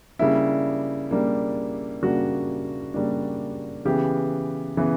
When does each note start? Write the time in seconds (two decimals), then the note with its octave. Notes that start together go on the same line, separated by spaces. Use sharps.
0.19 C#3 G3 A#3 D4 E4
1.11 C#3 G3 A#3 D4
2.02 C#3 G3 A#3 D4 F#4
2.94 C#3 G3 A#3 D4
3.85 C#3 E3 B3 G4
4.77 C#3 E3 B3